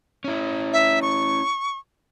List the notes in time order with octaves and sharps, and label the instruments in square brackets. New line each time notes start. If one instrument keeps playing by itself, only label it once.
[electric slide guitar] C#4 E4
[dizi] E5
C#6